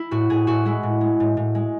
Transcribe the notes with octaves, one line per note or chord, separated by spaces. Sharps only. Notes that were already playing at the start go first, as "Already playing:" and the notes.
Already playing: E4
A2 F#4
A2 G#4
A2 F#4
G#3 E4
A2
G#3
A2
A2
G#3